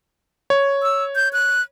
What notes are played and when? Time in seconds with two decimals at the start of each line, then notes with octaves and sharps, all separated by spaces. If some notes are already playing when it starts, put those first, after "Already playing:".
0.50 C#5
0.83 E6
1.16 G6
1.33 F#6